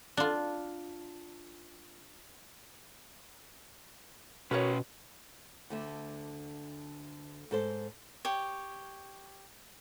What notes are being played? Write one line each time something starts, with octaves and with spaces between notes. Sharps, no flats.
D4 F4
B2 C#4 F#4 A#4 B4 C#5
D2 D3 E5
G#2 A4 C5
G4 C#5